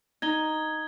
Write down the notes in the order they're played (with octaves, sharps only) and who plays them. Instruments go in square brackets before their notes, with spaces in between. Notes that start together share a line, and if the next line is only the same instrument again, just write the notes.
[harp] D#4 [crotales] G#6 G7